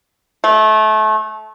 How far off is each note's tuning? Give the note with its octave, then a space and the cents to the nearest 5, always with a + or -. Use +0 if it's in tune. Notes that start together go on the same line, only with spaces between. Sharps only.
A3 -25